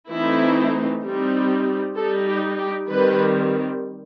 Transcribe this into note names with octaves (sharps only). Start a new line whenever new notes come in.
E3 A3 C4 D#4 E4
G3 C4 D#4
G3 D#4 A4
G4
G4
D#3 G3 C4 B4